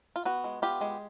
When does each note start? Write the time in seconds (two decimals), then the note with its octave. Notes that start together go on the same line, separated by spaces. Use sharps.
0.16 F4
0.25 B3 F#4
0.44 G#3
0.62 B3 F4 G4
0.81 G#3